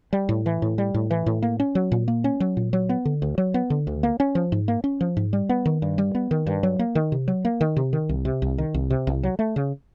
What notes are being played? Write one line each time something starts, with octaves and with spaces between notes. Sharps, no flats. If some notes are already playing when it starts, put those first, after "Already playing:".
G3
A2
E3
A2
G3
A2
E3
A2
A#3
C#4
F#3
A#2
A#3
C#4
F#3
A#2
F#3
B3
D3
D2
F#3
B3
D3
D2
A#3
C#4
F3
G#2
A#3
C#4
F3
G#2
G3
B3
D#3
G2
G3
B3
D#3
G2
F#3
A#3
D#3
C3
F#3
A#3
D#3
C3
D#3
C2
C3
C2
D#3
C2
C3
C2
F#3
A3
C#3